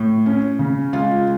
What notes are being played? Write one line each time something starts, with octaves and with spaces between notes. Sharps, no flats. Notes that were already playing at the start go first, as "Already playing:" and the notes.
Already playing: A2
C#4
C#3
G#3 F4